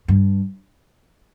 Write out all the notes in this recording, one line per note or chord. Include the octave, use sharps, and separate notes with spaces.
G2